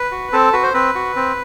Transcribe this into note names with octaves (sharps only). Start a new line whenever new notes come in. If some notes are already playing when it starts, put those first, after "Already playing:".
Already playing: B4
F#4
C4 A4
F#4 B4
C5
C4 B4
F#4
C4